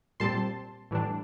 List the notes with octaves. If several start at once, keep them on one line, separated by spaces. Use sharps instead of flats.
A#2 G3 C4 A5 C6
A2 E3 G3 D4